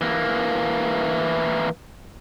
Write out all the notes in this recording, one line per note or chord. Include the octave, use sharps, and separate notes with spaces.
E3 A#3